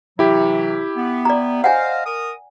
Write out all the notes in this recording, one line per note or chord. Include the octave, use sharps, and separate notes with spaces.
C3 E3 F#3 E4 G4
B3
D5 A#5
C5 D#5 F5 F#5 G#5
A#4 D#6